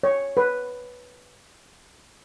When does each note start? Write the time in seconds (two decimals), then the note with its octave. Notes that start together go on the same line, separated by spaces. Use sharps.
0.03 C#5
0.37 B4